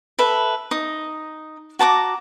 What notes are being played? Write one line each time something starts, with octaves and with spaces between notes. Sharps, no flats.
A4 B4 E5
D#4 D#6
F#4 A5 A#5 D6